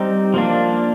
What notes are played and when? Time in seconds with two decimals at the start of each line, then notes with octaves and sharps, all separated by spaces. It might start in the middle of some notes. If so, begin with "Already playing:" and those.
Already playing: G3 C4 D#4 G4 C5
0.34 F3 A#3 D4